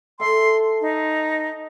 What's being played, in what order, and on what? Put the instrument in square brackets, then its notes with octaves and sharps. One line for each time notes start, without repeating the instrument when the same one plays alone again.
[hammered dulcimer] A4 E5 A5 [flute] C6
[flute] D#4